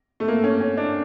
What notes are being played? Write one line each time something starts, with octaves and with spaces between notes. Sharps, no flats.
A3
A#3
C#4
C#4
D4